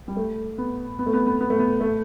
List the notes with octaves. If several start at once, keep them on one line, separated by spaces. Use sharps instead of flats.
G3
A3
B3
B3
A3
B3
B3
B3
A3
B3
A3